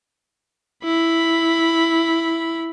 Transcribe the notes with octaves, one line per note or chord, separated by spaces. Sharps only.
E4 B5